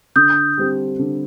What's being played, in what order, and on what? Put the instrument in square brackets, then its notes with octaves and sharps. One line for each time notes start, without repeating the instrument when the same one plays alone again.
[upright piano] D3 [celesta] D#6 G6
[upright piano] G3 C4 G4
D3